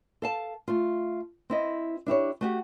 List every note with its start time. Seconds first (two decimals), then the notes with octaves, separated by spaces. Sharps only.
0.22 A4 F5 A5
0.68 A3 F4
1.50 C4 E4 D#5
2.06 D4 E4 G4 C#5
2.41 A3 F#4 G4